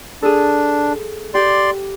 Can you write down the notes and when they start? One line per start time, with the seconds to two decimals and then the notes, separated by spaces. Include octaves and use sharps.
0.22 D4 G#4 A4
1.34 G4 D5 C6